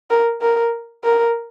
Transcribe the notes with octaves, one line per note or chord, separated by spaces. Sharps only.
A#4
A#4
A#4